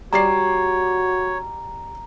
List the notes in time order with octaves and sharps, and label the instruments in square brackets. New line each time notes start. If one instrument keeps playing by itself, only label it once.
[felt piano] G3 D5 C7 [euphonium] F#4 [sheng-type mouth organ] C#5 [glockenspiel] A#5